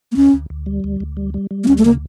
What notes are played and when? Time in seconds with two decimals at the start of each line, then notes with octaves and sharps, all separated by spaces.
0.12 A#3
0.16 D2 C#4
0.33 D2
0.50 D2
0.66 G3
0.84 D2
1.00 D2
1.17 G3
1.34 G3
1.51 G3
1.64 A#3
1.68 D2 C#4
1.78 A3
1.85 C#3 A#3